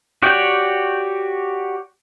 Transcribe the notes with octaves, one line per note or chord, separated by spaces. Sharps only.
F#4 G4 C#5 D5 G5